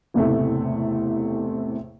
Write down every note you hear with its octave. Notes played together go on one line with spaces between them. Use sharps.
F#1 E2 A2 C3 A3